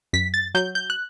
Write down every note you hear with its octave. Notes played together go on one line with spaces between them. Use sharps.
F#2 B6
A6
F#3 G6
G6
F#6